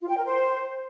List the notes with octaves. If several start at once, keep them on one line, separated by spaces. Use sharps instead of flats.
F4
G5
A#4
C5